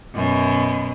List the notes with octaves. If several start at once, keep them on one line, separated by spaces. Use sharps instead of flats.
F#2 B2